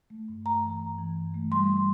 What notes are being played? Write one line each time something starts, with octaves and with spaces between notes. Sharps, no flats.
A3
G2
A3 A#5
E3
G2
E3
G2
A3
G3 C6
G3